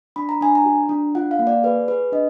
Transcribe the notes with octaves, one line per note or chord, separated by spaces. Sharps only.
D4 B5
A#5
D4 G#5
A#5
F#4
D4
F4 F#5
F5
A#3
D5
G#4 B4
G#4 B4
D4 D#5